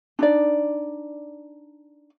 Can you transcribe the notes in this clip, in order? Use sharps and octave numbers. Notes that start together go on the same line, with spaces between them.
D4 D#4 D5